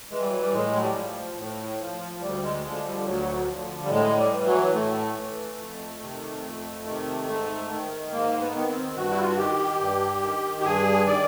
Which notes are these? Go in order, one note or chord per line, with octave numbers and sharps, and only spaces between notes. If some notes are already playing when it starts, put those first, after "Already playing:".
E3 G#3
G3
F#3
G3
A2 G#3
F#3
G3
F3
A2
F3
D2 G3
G#3
D3 F3 G#3
G3
D2 F#3
D3 F3
G3
A2 G#3
G3
E3
F#3
A2 A3
E3
F2
C3 D#3
F2
C3 D#3
G#2
D#3
G#2 A#3
B3
D#3 B3
C4
G2 F#4
E4
F4
F#4
D#3 G4
G2
D#3
G4
G2 G#4
D#3 D5